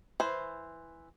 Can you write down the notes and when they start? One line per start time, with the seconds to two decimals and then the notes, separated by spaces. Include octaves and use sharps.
0.20 E3 C5